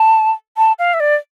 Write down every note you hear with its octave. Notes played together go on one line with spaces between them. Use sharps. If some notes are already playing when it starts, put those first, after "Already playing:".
Already playing: A5
A5
F5
E5
D5